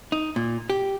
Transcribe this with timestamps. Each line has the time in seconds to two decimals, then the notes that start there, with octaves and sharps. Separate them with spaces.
0.12 D#4
0.36 A#2
0.70 G4